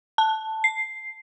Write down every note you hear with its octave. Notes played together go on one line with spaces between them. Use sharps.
A5
C7